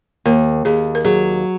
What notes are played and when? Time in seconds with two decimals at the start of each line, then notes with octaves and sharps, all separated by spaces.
0.26 D#2 A#4
0.65 D#2 G#4
0.95 A#4
1.05 F#3 G#4